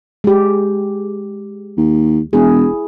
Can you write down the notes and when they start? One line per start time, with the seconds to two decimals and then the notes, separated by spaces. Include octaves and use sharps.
0.24 G#3 G4
1.77 D#2
2.33 E1 E4 G#4